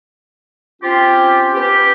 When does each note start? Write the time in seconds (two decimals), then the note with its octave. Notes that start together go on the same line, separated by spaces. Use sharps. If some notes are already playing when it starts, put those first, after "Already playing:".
0.82 C4 C#4 F4 G4
1.53 B3 C#4 G4